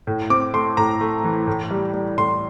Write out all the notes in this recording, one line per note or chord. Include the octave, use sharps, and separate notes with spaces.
A2
C4 D6
A3 C6
A2 A#5
A3
E3
A2
G3
G3
A2 C6